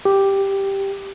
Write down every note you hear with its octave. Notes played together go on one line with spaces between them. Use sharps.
G4